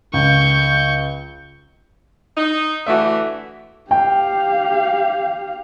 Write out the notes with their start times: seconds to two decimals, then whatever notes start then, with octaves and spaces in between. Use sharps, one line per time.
0.14 C#2 C#6 G6
2.36 D#4
2.87 D3 E3 A3 F#4 E5
3.91 G4 F5 G5